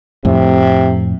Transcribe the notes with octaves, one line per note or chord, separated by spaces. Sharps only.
F2 A2 C3